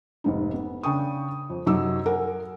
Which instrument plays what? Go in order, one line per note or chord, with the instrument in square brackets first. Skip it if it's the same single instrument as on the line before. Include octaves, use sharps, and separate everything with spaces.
[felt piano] F1 G#2 D#4
B3
C#3 D4 G5 C#6 D#6
F2
F#2 C3 F#3 D#4 D6 E6
A#4 F#5 G#5